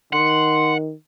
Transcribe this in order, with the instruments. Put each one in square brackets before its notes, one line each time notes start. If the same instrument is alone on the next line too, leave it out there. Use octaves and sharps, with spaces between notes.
[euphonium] D#3 [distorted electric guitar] F#5 [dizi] C6